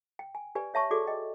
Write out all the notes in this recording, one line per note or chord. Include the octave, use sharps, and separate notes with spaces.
G5
G#5
G4 B4 D5 G#5
C#5 E5 A5 C#6
F#4 G#4 A4 D5 D6
D#5 G5